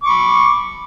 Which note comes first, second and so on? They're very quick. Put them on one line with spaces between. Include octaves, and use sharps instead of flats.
D6 C#6 B5